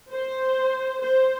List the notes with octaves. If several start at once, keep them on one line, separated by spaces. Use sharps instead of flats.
C5
C5